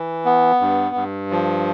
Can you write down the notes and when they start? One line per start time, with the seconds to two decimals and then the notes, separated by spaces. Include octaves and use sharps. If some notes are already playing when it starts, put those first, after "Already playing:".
Already playing: E3
0.25 B3
0.60 G2
0.95 G2
1.31 F3